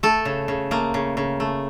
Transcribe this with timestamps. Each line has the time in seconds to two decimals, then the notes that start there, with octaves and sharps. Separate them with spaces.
0.03 A3 A4
0.25 C#3
0.48 C#3
0.71 A3 A#3
0.94 C#3
1.17 C#3
1.40 A3